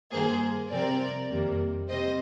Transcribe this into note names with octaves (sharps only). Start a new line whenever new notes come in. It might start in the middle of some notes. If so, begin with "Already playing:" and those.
G2 D#3 A#3 G#4 C5
C3 F3 C4 A#4 D5
F2 C3 D#3 G3 A#3
C3 G3 C4 C5 D#5